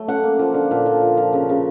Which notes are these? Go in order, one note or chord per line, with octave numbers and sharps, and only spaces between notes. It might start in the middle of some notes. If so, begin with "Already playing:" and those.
Already playing: F#3 A3
C#4 F#5
A#3
F3
D3
A#2
F3
F3
F3
C#3
C#3